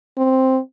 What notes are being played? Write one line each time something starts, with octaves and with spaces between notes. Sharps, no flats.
C4